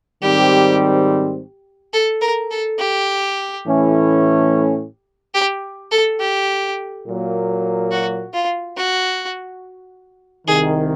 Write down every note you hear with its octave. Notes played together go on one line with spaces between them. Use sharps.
G#2 D#3 G3 C4 G4
A4
A#4
A4
G4
A2 E3 A3 C#4 E4
G4
A4
G4
A#2 F#3 A#3
F#4
F4
F#4
C2 C3 D#3 G#4